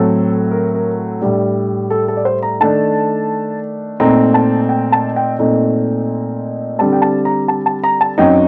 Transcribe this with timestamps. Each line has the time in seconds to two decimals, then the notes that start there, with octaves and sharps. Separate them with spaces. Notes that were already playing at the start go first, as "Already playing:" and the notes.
Already playing: A2 F#3 A3 C4 A4
0.51 A#4
0.74 A#4
1.21 A2 G3 D4
1.90 A4
2.08 A4
2.17 D5
2.25 C5
2.43 A#5
2.60 D#3 A3 D4 A5
4.00 A#2 A3 C4 D#4 A#5
4.34 A5
4.69 G5
4.92 A5
5.16 G5
5.39 A#2 A3 C4 D#4
6.79 D3 G3 C4 A5
6.93 G5
7.02 A5
7.25 A#5
7.48 A5
7.66 A5
7.84 A#5
8.01 A5
8.18 F#2 F#3 C4 D#4 G5